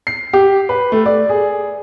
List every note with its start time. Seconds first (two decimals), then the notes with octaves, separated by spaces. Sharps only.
0.07 C7
0.33 G4
0.69 B4
0.92 A3
1.06 D5
1.29 G#4